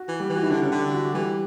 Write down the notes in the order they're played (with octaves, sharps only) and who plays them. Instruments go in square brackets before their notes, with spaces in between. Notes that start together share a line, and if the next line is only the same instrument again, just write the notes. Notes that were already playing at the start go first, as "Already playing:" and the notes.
Already playing: [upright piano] F#4
[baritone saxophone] E3
[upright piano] G3
[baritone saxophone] E3
[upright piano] F#4
E4
[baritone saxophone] D3 [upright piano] D4
[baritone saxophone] C#3
[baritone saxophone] D3 [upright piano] G4
[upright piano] F#4
[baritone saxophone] E3 [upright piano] G3